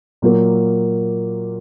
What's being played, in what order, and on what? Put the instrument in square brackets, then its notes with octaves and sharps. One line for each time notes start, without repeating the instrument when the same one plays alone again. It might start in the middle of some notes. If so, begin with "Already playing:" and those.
[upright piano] A#2 F#3 A#3